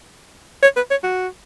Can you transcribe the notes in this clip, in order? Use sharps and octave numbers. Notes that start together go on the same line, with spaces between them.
C#5
B4
C#5
F#4